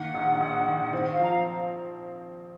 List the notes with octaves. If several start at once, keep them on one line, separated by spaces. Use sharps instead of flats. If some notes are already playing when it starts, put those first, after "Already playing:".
Already playing: D#3 A#3 F#5
A#1
A#1
D#3
C4
F5
F3 A#5